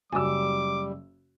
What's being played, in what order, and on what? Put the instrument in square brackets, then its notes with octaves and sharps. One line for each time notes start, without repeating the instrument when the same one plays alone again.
[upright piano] F#1 F#2 E6 [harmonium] G3 [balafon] F#4 G#5 [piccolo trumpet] D6